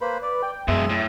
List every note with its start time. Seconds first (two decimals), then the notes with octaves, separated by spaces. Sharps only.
0.01 A#3 B4 C5 B5
0.22 D5
0.43 G5
0.68 F#2 B2 G#3 G#4 E5 C6
0.89 A2